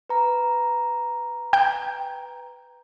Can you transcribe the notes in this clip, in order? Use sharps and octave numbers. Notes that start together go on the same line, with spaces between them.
B4 A#5
G5 G6